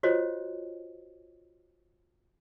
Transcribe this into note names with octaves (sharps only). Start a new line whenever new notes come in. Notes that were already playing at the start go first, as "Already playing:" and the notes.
F4 F#4 C5 C#5 D#5